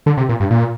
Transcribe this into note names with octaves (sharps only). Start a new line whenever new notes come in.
D3
C3
A#2
G2
A#2